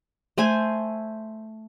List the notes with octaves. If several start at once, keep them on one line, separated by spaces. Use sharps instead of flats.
A3 C5 G#5